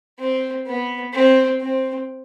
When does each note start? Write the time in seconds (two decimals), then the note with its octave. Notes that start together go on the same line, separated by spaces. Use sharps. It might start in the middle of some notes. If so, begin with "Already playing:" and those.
0.19 C4
0.67 B3
1.13 C4
1.60 C4